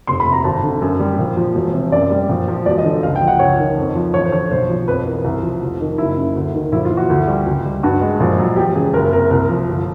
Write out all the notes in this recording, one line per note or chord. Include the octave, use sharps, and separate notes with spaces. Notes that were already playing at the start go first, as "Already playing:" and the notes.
F1 C6
B5
C3
A#5
G#1 A5
D3
F#2
G3
A#1
F3
E1
C3
F#2 D5
G3
A#1
F3
E1 D5
D#5
D3
C#2 F5
G5
F3
F#5
C#2 C#5
D#3
F2
F3
A1 C#5
C5
D3 C#5
B1 C5
F3
F2 B4
E3 A#4
C2
F3
F1
D#3
F#1 E4
C#3
D2
D#3
A#1 E4
F4
E3
F#4
D2
G3
C#2
G3
G2 F#4
G#3
A#1
F#3
E1 G4
C#3 G#4
F#1 A#4
C3 A#4
C2 A#4
F3
G1